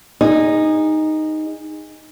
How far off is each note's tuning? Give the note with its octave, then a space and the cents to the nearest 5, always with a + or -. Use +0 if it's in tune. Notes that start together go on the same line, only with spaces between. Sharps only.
D#4 +0 G#4 -25